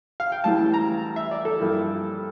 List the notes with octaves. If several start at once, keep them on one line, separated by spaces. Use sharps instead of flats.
F5
G5
A1 A2 E3 G3 A5
A#5
E5
D5
A4
G2 F3 A#3 E4